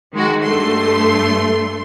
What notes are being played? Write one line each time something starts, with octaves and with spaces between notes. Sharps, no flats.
D#3 G#3 F#4
G2 A3 C6